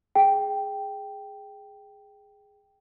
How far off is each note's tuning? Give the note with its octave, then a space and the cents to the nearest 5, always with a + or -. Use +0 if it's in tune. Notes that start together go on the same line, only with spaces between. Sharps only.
G#4 +0 G5 +0